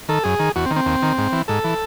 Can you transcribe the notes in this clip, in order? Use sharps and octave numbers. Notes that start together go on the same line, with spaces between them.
D#3 A4
F#2 G#4
D#3
E2 F#4
C4
D#3
C4
D#2
D#3
G#2
E3
G#2 A4
E3